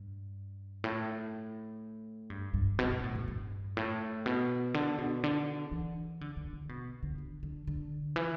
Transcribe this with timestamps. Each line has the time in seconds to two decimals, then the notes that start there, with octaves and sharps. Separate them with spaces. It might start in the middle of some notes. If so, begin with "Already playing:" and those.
Already playing: G2
0.84 A2
2.30 G2
2.54 G2
2.79 B2
2.91 B2
3.04 A2
3.15 E2
3.28 G2
3.77 A2
4.26 B2
4.74 D3
4.98 B2
5.24 D3
5.71 E3
6.21 D3
6.37 D3
6.53 D3
6.69 B2
7.03 D3
7.18 D3
7.43 D3
7.67 D3
8.16 E3